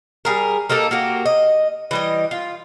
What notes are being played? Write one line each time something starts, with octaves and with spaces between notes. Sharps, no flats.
G3 G#4 A#4
A#3 D#4 G4 A4
A#3 F#4 G4
D#5
E3 G3 D#5
F4